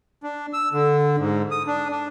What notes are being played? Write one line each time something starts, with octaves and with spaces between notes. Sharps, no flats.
D4
E6
D3
G#2
D#6
D4
D4